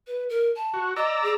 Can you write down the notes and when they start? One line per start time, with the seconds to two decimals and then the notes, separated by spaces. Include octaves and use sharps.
0.07 B4
0.29 A#4
0.56 A5
0.74 F#4
0.96 D5 D#5 A#5 E6
1.23 G#4